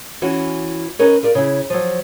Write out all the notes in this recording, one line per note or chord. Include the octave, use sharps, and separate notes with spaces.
E3 C#4 F#4
C#4 D#4 A#4 B4 C#5
F4 A#4 D5
C#3 E4
F3 F#3